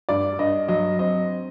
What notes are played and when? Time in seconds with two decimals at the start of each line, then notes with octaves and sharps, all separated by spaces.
0.09 G2 D5
0.39 G2 D#5
0.68 F#3 D#5
0.99 C4 D#5